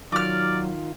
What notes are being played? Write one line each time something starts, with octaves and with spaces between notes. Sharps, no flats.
D#3 F#3 F4 D5 D6 F6